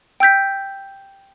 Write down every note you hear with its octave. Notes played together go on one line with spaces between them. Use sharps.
G5 E6 G6 B6